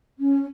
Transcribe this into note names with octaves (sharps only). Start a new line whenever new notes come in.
C#4